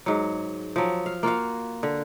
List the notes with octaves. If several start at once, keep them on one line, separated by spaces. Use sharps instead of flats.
G#2 F#3
F3 F#3
F5
A#3 F4 F#4 F5
D3